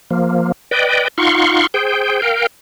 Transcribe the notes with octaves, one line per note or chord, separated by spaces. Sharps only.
F3 A#3
B4 D5 D#5 G5
D#4 F4 F5 F#5 C6 C#6
G#4 C5 G5
A#4 F5 G5